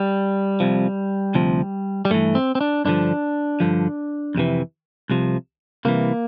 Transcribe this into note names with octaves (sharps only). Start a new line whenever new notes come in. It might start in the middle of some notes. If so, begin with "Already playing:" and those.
Already playing: G3
C2 C3 F3
D2 C3 F3
G3
G2 E3 A3
C4
C4
D4
G2 D3 F3 D4
G2 D3 F3
F2 C3 E3
C2 C3 F3
C2 C3 E3 A#3